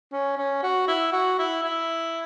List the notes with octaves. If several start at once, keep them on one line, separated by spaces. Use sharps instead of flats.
C#4
C#4
F#4
E4
F#4
E4
E4